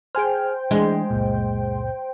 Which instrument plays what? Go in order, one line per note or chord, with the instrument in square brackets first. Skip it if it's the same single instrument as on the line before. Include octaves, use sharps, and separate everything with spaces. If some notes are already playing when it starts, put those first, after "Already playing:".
[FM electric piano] G#4 G#5 F6 [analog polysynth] C5 G5
[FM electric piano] E3 D4 [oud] G#3
[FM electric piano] C#2 F#2 A#2